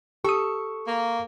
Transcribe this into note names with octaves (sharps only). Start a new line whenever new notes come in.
G4 A4 C#6 D#6
A#3